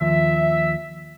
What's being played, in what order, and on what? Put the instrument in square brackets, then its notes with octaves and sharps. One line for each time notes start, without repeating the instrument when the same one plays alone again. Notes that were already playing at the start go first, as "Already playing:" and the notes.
[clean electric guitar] D#2 F3 [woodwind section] E5